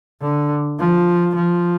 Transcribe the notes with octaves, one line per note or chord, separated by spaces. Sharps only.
D3
F3
F3